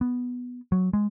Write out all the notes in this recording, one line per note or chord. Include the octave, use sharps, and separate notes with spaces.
B3
F#3
G#3